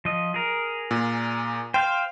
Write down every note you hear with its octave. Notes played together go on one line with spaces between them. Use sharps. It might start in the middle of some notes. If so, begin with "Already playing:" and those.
F3 D#5
G#4 A#4
A#2
C5 F5 G5